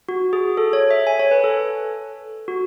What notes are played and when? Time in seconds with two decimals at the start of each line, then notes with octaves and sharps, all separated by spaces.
0.09 F#4
0.33 G#4
0.57 A4
0.73 C#5
0.91 E5
1.07 G#5
1.19 C#5
1.31 B4
1.44 A4
2.48 F#4